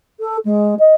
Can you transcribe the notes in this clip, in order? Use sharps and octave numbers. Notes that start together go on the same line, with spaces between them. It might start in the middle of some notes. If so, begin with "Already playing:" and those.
A4
G#3
D#5